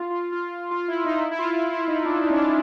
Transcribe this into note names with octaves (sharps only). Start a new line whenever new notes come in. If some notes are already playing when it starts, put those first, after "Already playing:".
Already playing: F4
F4
F4
F4
E4
D#4
E4
E4
F4
F4
E4
D#4
D4
D4
C#4
D4